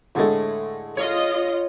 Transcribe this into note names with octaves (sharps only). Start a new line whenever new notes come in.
A2 D3 G#3 A3
F4 C#5 D#5